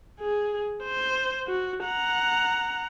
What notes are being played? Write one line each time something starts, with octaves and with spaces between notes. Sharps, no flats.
G#4
C5
F#4
F#5 A#5